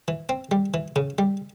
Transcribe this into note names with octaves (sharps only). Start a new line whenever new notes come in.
E3
C4
G3
E3
C#3
G3